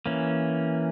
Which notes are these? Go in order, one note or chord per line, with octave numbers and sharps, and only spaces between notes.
E3 A#3 C#4